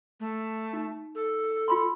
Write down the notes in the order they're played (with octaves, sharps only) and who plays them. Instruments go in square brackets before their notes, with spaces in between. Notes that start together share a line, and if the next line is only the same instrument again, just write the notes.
[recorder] A3
[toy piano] D#4
[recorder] A4
[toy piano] F4 B5 C6